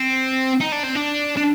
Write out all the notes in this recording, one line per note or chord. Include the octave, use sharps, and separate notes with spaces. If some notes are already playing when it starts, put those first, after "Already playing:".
Already playing: C4
D#4
D4
C4
D4
D4